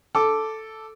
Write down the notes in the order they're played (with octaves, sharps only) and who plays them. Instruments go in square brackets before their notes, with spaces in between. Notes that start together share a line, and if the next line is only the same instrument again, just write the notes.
[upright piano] A4 D6